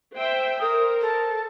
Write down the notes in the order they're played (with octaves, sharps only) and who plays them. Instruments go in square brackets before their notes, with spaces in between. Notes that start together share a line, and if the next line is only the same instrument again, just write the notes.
[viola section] C5 E5 G5
[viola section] A#4 C5 [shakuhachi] D#6
[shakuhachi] A4